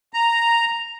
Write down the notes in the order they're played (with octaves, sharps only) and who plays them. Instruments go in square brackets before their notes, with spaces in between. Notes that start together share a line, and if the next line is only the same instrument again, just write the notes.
[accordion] A#5